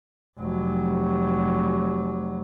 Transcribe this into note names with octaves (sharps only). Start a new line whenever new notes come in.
F1 F#3